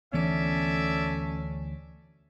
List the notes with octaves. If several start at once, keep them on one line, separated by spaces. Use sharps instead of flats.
D2 E3 B3 C#4 A4 D5 E5